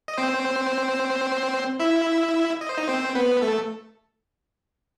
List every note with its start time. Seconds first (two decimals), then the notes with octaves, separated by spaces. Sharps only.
0.08 D#5
0.18 C4 C5
1.80 E4 E5
2.61 D#5
2.69 C5
2.78 D#4 D#5
2.88 C4 C5
3.15 B3 B4
3.42 A3 A4